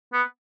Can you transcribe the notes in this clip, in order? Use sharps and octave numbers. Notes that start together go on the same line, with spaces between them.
B3